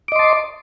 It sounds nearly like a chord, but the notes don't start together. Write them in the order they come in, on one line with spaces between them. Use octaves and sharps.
D6 D#5 C6 A5